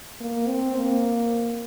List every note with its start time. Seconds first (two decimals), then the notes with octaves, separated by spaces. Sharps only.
0.20 A#3
0.48 C4
0.77 A#3